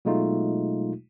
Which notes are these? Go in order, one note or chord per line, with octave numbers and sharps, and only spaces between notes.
B2 F#3 G#3 A3 D#4 F4